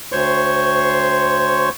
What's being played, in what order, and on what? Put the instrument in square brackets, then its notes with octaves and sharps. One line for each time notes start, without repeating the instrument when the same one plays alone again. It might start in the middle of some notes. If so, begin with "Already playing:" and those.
[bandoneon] D2 C5 C#5 C6 C#6